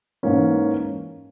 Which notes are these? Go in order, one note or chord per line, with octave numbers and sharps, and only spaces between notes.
G#2 E3 A#3 C#4